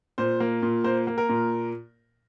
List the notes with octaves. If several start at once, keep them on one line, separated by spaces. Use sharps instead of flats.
A#2 C5
A#3
A#2
A#3 C5
A#3
A#4
A#2